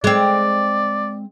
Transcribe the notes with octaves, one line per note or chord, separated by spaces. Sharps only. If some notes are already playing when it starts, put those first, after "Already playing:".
G#3 C4 D5